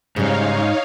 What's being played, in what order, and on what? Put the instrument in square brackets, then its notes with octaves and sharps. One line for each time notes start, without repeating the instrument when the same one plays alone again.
[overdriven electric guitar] G#2 [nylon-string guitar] C#3 G3 [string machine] D#4 C#5 F5